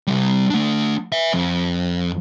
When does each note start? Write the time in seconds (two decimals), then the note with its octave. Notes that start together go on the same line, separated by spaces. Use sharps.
0.07 C3 G3
0.50 A3 D4
1.12 B4 E5
1.34 F2